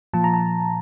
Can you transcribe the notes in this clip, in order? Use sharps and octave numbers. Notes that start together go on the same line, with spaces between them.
A#2 F3 A5
A#5
A5